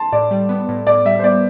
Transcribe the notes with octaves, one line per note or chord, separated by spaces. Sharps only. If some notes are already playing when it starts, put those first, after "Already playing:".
Already playing: A5 C6
A2 D5
G3
B3
A2
A2 D5
G3 E5
C5
B3 D5